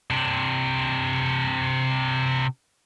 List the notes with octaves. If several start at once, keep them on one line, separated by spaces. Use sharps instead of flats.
C3 D4